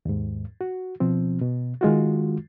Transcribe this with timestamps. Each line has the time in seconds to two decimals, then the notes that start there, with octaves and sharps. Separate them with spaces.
0.05 D#2 G#2
0.61 F#4
1.00 B2 F3 C4
1.41 B2
1.81 D#3 G#3 F4 F#4